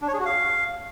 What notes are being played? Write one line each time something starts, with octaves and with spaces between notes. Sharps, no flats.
D4
C#5
G#4
F#4
F5